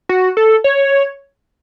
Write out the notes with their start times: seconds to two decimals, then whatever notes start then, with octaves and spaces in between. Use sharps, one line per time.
0.09 F#4
0.37 A4
0.64 C#5